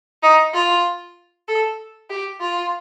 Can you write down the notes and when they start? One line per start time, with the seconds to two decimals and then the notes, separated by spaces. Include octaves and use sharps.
0.23 D#4
0.54 F4
1.48 A4
2.10 G4
2.41 F4